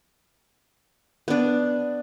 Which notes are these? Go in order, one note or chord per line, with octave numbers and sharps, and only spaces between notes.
B3 D4